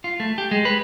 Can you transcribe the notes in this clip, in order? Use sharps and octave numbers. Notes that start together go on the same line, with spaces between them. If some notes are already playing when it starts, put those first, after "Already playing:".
F4
A3
G4
G#3
B4